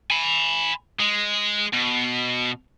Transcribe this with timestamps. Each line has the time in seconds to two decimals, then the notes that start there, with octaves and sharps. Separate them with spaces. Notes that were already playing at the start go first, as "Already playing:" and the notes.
0.10 G#5 B5
1.00 G#3
1.73 B2